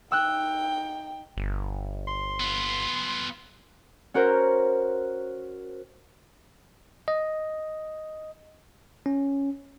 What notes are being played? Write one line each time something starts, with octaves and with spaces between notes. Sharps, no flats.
D#4 G5 E6 F#6
G1
C6
B3 F4
C#4 F#4 A#4 C5
D#5
C#4